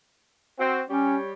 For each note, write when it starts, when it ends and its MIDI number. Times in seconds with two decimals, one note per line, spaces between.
0.60 0.82 60
0.60 0.82 66
0.90 1.33 55
0.90 1.17 61
0.90 1.33 67
0.90 1.33 73